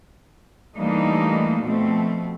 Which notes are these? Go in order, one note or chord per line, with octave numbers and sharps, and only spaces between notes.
E3 G3 A3 A#3 D4 D#4
B2 F3 A3 C4